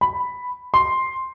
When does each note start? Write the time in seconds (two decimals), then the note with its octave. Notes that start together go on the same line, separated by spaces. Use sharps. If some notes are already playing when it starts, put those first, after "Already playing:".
0.01 B5
0.74 C6